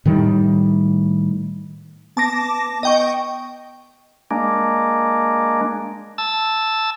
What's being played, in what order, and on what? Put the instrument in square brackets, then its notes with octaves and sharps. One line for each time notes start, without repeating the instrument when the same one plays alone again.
[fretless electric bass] A2 D#3 G3
[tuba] B3 [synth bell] A5 D6 A#6
[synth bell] D#5 G5 C#6
[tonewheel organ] G#3 A#3 D4
A5 E6